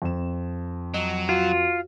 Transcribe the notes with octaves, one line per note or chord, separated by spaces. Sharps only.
F2 E7
F#3 D#5
F4 F#4